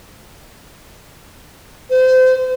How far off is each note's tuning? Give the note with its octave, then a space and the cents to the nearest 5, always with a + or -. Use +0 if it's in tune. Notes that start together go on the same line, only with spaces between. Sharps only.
C5 -30